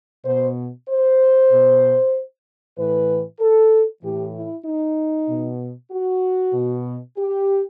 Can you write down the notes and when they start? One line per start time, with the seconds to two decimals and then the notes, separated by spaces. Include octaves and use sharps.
0.25 B2 C5
0.89 C5
1.51 B2
2.77 A2 E3 B4
3.39 A4
4.02 A2 E3 G4
4.34 E4
4.65 D#4
5.28 B2
5.91 F#4
6.54 B2
7.17 G4